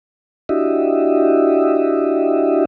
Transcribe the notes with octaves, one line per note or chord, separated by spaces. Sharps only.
D4 E4 F#4 G4 D#5 E5